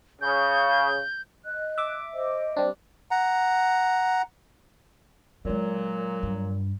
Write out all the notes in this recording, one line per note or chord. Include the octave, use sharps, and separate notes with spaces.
C#3 G6
D#5 F#6
E5 D6
C5 D#5
G3 C4 D4
F#5 A#5
A#2 F#3 G#3 C4
G2